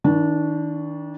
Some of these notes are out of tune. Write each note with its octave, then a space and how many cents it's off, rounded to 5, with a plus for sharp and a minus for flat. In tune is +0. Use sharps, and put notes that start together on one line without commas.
D#3 +30 D4 -15